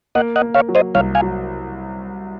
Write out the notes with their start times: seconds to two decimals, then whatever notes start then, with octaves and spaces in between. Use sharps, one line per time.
0.15 A#3 D#5 F#5
0.36 D#5 F#5
0.42 A#3
0.55 C#5 F5
0.69 F#3
0.75 C5 D#5
0.94 C2 C#5 F5
1.15 F5 G#5
1.22 F#3